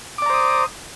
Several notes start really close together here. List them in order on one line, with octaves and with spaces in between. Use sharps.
D6 D5 A#5 C5 D#6